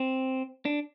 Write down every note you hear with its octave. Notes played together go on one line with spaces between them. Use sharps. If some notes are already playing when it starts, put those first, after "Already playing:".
Already playing: C4
D4